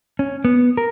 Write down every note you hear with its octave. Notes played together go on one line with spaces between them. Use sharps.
C#4
B3
A#4